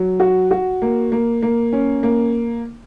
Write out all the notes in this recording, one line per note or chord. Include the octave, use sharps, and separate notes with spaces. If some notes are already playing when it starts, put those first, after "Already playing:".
Already playing: F#3
F#4
F#4
A#3
A#3
A#3
C#4
A#3